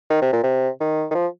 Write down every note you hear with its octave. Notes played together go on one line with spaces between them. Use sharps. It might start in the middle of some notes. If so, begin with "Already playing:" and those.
D#3
C3
A#2
C3
D#3
D#3
F3